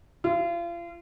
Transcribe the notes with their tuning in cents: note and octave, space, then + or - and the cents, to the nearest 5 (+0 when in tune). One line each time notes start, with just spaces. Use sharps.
F4 -35